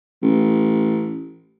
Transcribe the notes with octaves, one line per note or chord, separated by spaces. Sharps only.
A1